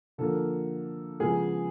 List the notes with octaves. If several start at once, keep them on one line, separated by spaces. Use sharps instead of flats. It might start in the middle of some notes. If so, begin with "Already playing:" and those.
D3 F3 A#3 A4
C#3 F3 G#3 B3 G#4